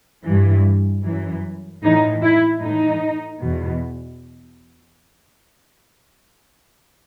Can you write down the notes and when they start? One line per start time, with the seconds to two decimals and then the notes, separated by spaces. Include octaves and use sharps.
0.25 G2 E3
1.04 F#2 E3
1.83 A2 E3 D#4
2.22 E4
2.61 A2 E3 D#4
3.40 E2 B2